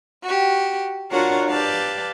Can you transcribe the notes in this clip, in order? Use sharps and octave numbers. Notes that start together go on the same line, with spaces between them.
F#4 G4
D4 F4 F#4 A#4 C#5 F#5
G4 B4 D5 F5 A5